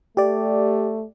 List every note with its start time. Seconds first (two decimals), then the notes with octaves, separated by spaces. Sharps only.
0.17 A3 G4 D5